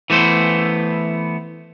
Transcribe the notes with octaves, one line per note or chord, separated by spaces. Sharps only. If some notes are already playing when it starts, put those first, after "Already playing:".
E3 A3 B3 C5